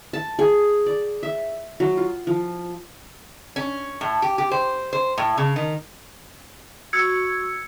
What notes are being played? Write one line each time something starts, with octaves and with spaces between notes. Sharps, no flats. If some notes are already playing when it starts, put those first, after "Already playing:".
A5
G#4
D5
E5
F#3
F4
F3
C#4
A2
G4
G4
C5
C5
A2
C#3
D#3
F#4 C#6 E6 G#6 C#7